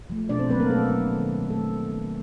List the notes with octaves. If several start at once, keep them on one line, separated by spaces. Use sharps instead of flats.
F3 A3
B2 D4 D5
C4 C5
F#3 A#3 B3 B4
A#3 A#4
B2 A3 A4
F#3 A#3
D#3
G3 A#3
D#3 A3 A4
G3 A#3
D#3